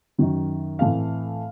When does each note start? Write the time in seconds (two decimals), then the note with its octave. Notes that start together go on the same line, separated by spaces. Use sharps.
0.18 F#2 D#3 F#3
0.79 A2 E3 A3 C4 F5